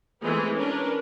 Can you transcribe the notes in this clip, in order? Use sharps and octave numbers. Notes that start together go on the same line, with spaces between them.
E3 G#3 A3 C4 G#4 B4
C#4 D4 A#4 B4